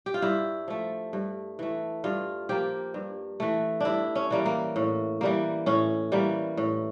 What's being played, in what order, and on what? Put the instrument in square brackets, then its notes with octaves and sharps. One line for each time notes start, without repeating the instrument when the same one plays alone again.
[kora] G4
F4
G2 E4
F3 A3
G2
E3 A3
G2 F4
F3 A#3 G4
G2
E3 A3
G2 D4 E4
C#4
E3 G3 A#3
A#3
A2
E3 G3 A#3
A2 C#4
E3 G3 A#3
A2